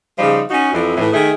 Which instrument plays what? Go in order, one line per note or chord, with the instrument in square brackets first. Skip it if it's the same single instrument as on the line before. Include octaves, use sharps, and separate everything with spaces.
[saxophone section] C#3 F3 G3 D#4
C#4 D#4 F#4
F2 E3
A2 E3
D#3 A3 G#4